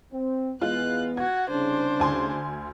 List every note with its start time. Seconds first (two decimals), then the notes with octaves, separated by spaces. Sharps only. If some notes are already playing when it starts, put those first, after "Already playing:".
0.13 C4
0.61 E2 G#3 B3 F4 F#6
1.17 F#4 F#5 G#6
1.50 C2 C#3 D4 C5
2.00 D2 G#5 C6